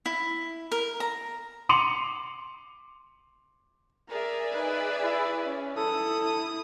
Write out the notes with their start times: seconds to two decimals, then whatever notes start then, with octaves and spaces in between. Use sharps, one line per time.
0.06 E4
0.72 A#4
1.00 A#5
1.69 C6 D6 C#7 D#7 F7 F#7
4.10 G#4 A#4 D5 E5
4.54 D#4 B4
5.03 E4
5.45 C#4
5.76 E4 A4 D#6